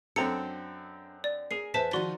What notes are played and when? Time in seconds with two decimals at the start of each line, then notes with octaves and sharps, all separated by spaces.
0.16 F#2 C4 D4 A4 A#5 C#7
1.24 D5
1.51 G#4 A#4 G#5 C7
1.74 E2 B4 C5 E5 A5 B6
1.93 D#3 F3 D#4 F#4 D5 C6